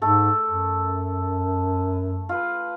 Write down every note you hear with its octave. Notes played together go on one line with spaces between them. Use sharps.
G#2 A3 A4
F#2
F4 B4